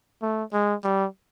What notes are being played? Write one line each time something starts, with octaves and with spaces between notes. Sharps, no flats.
A3
G#3
G3